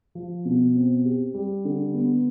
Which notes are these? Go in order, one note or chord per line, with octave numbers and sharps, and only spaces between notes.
F3
B2
C4
G4
G3
D3
B3